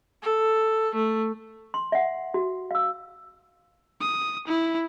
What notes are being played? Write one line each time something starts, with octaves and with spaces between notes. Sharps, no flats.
A4
A3
C6
E5 F#5
F#4
F5 E6
D#6
E4